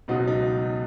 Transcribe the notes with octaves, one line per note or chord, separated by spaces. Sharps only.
C#2 B2 F#3 D#4
D#4